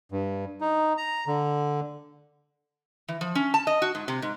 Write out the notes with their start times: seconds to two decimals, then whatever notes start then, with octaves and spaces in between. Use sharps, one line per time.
0.12 G2
0.61 D#4
0.97 A#5
1.27 D3
3.08 E3
3.21 F3
3.35 C#4
3.54 A5
3.67 D#5
3.82 F#4
3.95 G#2
4.08 C3
4.22 G#2